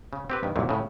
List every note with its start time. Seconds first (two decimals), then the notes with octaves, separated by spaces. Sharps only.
0.13 C#3
0.30 C4 G4 B4
0.43 G2 D#3
0.56 C2 F#2 A#2
0.69 A2 C#3